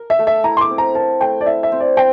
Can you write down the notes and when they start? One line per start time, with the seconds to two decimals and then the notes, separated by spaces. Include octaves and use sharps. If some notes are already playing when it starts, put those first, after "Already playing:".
Already playing: A#4
0.10 E5
0.19 A3
0.27 E5
0.44 E4 A#5
0.57 C6
0.61 D6
0.70 C4
0.78 A#5
0.94 A#4 A5
1.21 A3 G5
1.41 D5
1.46 E4 E5
1.63 E5
1.72 C4
1.80 D5
1.97 C4 G5